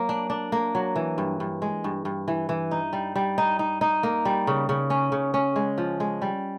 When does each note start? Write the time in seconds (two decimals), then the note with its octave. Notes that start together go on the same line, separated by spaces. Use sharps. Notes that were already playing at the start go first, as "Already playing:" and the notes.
Already playing: F#3 A#3
0.09 D4
0.30 D4
0.52 A#3
0.75 F#3
0.96 E3
1.18 G2
1.40 G2
1.62 G#3
1.84 G2
2.05 G2
2.28 E3
2.49 E3
2.71 D#4
2.93 G3
3.16 G3
3.38 D#4
3.59 D#4
3.81 D#4
4.03 A#3
4.25 G3
4.47 C#3
4.69 C#3
4.90 C#4
5.12 C#3
5.34 C#4
5.56 G#3
5.78 F3
6.00 G#3
6.22 G3